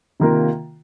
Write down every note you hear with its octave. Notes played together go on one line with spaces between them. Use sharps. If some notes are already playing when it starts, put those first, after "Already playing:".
C3 D#3 A#3 F4 A#4